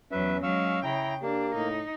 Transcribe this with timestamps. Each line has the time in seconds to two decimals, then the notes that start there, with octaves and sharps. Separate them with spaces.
0.12 E2 F#3 C#4 B4 E5
0.43 F#3 G#3 F5 C#6 E6
0.84 C#3 E4 G5 A#5
1.22 A#3 D4 G4
1.54 A2 D#4